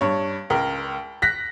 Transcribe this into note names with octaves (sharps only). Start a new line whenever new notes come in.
G2 C#5
C#2 A#4
F#6 A#6 B6